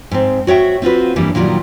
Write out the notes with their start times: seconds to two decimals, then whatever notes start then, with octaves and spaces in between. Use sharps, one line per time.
0.11 G#2 C4
0.47 F#4 C#5 E5 G5
0.82 C4 F4 F#4 B4
1.16 G2 E3 G3 A#3
1.35 A#2 D#3 E3 F#3 G3